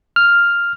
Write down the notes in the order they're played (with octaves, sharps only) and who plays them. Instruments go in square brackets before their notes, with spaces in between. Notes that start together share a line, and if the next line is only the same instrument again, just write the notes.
[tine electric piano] F6